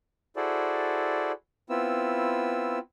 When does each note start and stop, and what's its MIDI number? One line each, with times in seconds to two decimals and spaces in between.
0.36 1.32 64
0.36 1.32 66
0.36 1.32 68
0.36 1.32 69
0.36 1.32 72
0.36 1.32 74
1.70 2.79 59
1.70 2.79 60
1.70 2.79 64
1.70 2.79 65
1.70 2.79 88